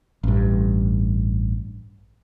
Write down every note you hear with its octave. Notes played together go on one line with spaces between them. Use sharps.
A1 G2